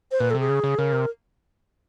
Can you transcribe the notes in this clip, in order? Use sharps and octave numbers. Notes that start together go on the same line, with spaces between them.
C5
A#2 B4
C3 A4
G#4
C#3
C#3
C#3 A#4
C3